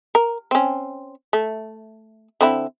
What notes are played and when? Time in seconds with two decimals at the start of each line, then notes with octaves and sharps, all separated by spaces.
0.15 A#4
0.51 C4 C#4
1.33 A3
2.41 D3 C4 E4